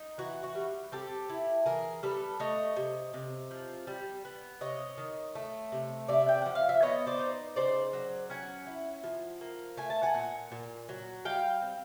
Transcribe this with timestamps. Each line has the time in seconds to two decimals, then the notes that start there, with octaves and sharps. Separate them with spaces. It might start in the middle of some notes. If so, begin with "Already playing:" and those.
Already playing: D#4
0.18 E3 F#4
0.43 F#4
0.55 G3
0.92 C4 G4 A4
1.29 E4
1.66 E3 G#4 A#4
2.03 G3 A4 B4
2.40 A3 C#5 D#5
2.76 C3
3.14 C3
3.51 F3
3.87 G3
4.25 B3
4.61 C3 C#5 D#5
4.98 D#3
5.35 A3
5.72 C3
6.08 C3 D5 E5
6.29 G5
6.42 F3 F#5
6.55 F5
6.69 E5
6.82 B3 C#5 D#5
7.07 C5 D5
7.19 D#4
7.56 C#3 C5 D5
7.93 F#3
8.30 C#4 F#5 G#5
8.67 E4
9.04 F3
9.41 A#3
9.77 A3 G#5
9.90 A5
10.03 F#5 G#5
10.15 A#2
10.52 A#2
10.89 F#3
11.25 G3 F5 G5
11.62 C4